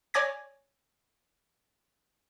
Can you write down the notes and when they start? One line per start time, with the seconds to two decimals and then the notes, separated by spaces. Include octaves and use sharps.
0.14 C#5 D5 G#5 D6 G#6 A#6